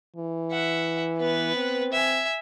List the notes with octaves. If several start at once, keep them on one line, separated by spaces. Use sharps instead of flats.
E3
E5 F#5
B3 B4
C4
E5 G#5